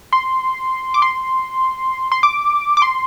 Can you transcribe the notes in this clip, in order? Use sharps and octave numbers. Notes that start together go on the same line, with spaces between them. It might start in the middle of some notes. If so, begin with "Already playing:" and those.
C6
D6
C6
C6
D6
D6
C6